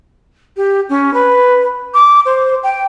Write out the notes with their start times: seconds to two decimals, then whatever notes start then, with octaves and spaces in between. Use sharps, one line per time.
0.56 G4
0.89 C#4
1.13 B4
1.94 D6
2.25 C5
2.63 G5